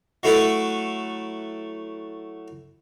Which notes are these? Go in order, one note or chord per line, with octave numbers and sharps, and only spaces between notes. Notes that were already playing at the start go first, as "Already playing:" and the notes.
F#3 A3 E4 A4 B4